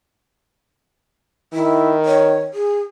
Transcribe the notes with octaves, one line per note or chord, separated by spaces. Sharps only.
D#3 E4
C#5
G#4